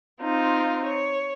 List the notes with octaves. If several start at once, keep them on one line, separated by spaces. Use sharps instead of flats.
C4 D#4 F4
C#5